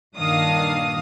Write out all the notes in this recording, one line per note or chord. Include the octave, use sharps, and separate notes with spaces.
G2 A#2 D#3 D4 F5 D#6